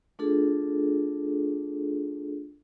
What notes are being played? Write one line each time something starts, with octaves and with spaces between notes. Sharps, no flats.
A3 D4 F4 G#4 A4